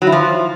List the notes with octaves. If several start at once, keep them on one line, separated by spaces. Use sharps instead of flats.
F#3
E4
F3